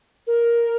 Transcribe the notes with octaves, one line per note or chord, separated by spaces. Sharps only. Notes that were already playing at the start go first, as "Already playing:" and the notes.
A#4